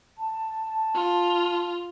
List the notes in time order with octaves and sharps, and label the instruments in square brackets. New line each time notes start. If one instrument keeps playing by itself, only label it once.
[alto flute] A5
[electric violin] F4